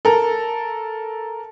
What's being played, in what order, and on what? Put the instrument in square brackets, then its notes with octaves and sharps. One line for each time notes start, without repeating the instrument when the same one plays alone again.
[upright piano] A4 A#4